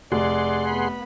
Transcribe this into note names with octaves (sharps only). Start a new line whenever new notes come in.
F1 G#4 D5 F#5 C6
B3 B5